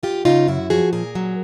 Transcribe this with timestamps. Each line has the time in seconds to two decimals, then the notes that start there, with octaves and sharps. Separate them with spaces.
0.03 F#2 F4 G4
0.25 C#3 D#4 F4
0.48 F#2 E4 F#4
0.70 F3 F#4 G#4
0.93 A#2 G#4 A#4
1.15 F#3